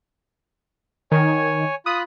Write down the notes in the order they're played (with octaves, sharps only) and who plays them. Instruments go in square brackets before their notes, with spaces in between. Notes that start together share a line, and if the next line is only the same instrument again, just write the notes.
[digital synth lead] D#3 [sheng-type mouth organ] C#5 G#5
[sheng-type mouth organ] F4 B5 F#6 [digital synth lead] D#6